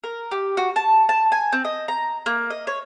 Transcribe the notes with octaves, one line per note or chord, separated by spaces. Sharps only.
A#4
G4
F#4
A5
A5
G#5
C4
D#5
A#5
A#3
D#5
C#5